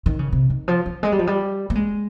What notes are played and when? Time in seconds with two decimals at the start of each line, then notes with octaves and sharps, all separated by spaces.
0.06 D#3
0.19 C#3
0.32 C3
0.50 D#3
0.68 F3
0.86 F3
1.03 G#3
1.12 G3
1.19 F3
1.27 G3
1.70 A#3
1.75 G#3